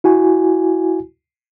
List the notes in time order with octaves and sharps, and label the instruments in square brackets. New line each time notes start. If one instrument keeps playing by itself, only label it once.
[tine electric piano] E4 F#4 G#5